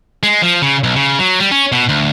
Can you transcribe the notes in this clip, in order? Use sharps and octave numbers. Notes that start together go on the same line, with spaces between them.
G#3
F3
C#3
B1
C#3
F#3
G3
C#4
B2
D2